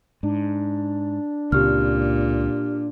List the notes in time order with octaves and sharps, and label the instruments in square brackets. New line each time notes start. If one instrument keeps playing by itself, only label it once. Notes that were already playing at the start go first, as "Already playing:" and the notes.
[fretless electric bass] G#2 [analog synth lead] D4
[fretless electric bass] C#2 C#3 C4 [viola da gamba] A#2 [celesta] G4 F6